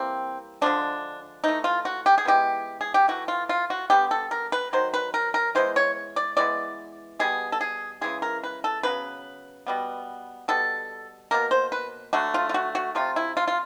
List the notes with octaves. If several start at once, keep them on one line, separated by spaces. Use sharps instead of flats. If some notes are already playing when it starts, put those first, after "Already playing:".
Already playing: E3 G3 A#3 C4
D3 F3 G#3 D4
E3 A3 D#4
F4
F#4
G4
G#4
E3 G#3 B3 G4
G#4
G4
E3 A3 F#4
F4
F4
F#4
D3 G3 B3 G4
A4
A#4
B4
D#3 F#3 C5
B4
A#4
A#4
E3 G#3 B3 C5
C#5
D5
E3 G#3 B3 D5
B2 G3 B3 G#4
A4
G#4
C#3 E3 G#3 G#4
A#4
B4
A4
C#3 F#3 B3 B4
B2 G3 B3
B2 G3 B3 A4
B2 G3 A#3 A#4
C5
B4
D3 F#3 A3 F#4
F4
F4
F#4
F#4
C3 F3 A3 F4
E4
F4
F4